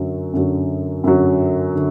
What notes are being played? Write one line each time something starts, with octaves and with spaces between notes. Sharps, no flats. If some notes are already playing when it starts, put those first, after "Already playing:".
Already playing: F#2 D3 F#3
F#2 D3 F#3
F#2 D3 F#3
D3